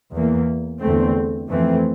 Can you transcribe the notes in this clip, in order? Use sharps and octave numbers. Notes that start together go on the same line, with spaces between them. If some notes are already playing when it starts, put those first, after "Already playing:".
E2 E3 A#3
E2 D3 A3 C4
F2 E3 A3 C4